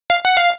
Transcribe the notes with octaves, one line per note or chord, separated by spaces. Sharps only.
F5
F#5
F5